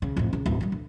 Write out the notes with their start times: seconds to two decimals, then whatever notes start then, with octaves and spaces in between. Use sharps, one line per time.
0.02 C#3
0.17 F2 A2
0.33 C#3
0.46 D1
0.60 D#3 G3
0.72 D3